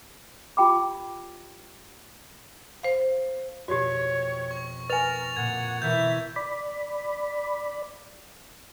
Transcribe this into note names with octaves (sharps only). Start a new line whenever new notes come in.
F4 G4 G5 B5 D6
C5 F5
F2 B2 F#4 G4 C#5
C#6
A#4 B4 G#5 A6 F7
A#2 A#3 F#5 G#6
B2 E3 A#4 E5 G6
D5 B5